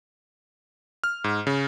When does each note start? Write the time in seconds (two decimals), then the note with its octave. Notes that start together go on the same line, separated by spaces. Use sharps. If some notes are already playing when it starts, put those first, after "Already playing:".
1.04 F6
1.24 G#2
1.47 C#3